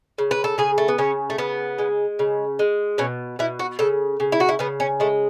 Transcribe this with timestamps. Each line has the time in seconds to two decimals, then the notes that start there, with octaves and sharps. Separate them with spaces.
0.18 C#3
0.31 B4
0.44 A4
0.58 C#3 G#4
0.78 A3
0.88 B3
0.98 C#3 C#4
1.30 A3
1.38 C#3 B3
1.79 G#3
2.19 C#3
2.59 G#3
2.98 B2 C#4
3.39 B2 E4
3.59 F#4
3.79 C#3 A4
4.20 C#3
4.32 E4
4.40 F#4
4.49 E4
4.59 C#3 B3
4.80 C#4
5.00 G#3 A3